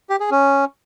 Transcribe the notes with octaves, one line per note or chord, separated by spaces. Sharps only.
G4
G#4
C#4